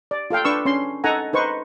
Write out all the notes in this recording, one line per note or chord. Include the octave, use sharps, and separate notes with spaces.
D5
F4 A4 F5 G5
D4 B4 C#6 E6
C#4 C6
D#4 A4 F#5 G#5 A#5
D#4 B4 C5 C#6